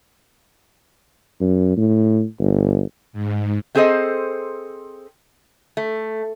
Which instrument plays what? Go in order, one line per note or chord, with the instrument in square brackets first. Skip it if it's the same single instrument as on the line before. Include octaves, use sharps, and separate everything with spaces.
[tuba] F#2
A2
G1
[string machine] G#2
[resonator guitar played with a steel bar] A3 C4 G#4 A4 C5 D#5
A3